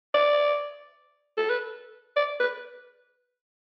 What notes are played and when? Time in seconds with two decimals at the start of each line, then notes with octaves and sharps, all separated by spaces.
0.14 D5
1.37 A4
1.50 B4
2.16 D5
2.40 B4